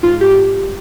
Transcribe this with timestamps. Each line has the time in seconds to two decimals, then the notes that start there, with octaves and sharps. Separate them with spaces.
0.03 G#2 F4
0.21 G4